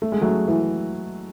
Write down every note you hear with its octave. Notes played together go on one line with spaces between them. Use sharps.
A3
G#3
F#3 A3
E3